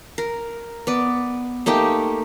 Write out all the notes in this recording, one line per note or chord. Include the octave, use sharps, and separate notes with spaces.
A#4
B3 D5
A3 A#3 D#4 G4